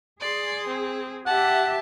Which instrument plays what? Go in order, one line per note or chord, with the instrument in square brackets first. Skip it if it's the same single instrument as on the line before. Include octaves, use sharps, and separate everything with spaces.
[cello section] G#4 [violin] D5 C6
[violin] C4
[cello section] G4 E5 [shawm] F#5 [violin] A5